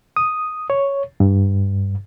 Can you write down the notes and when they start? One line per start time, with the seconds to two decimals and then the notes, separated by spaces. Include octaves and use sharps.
0.16 D#6
0.70 C#5
1.20 G2